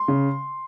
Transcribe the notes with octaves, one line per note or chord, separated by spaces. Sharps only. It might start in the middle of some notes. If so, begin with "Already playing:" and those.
Already playing: C6
C#3